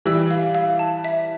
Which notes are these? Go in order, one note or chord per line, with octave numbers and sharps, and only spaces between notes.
E3 G3 E6
F5
F5
A5
E5